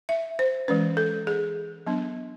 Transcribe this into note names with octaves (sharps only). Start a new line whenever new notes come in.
E5
C5
E3 G#3 C#4 B4
A4
G#4
F#3 B3 D4